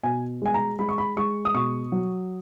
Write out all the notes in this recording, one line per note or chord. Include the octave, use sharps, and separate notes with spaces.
B2 G#5
G#3 G#5
A#5
G#3 B5
C#6
B5
G#3 C#6
D#6
B2 C#6
F#3